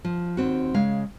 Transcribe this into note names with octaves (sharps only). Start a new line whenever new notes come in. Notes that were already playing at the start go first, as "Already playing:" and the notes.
F3
D#2 C4 F#4
C#3 G#3 F5